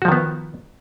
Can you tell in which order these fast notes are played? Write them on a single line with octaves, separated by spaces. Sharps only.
F#4 F3 D#3 B3